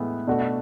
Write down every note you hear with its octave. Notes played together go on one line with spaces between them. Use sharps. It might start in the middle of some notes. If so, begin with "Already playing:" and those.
Already playing: A2 E3 G#3 B3
B2 A3 D4 F#4